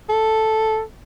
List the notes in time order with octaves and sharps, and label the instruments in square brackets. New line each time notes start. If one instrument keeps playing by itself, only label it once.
[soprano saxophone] A4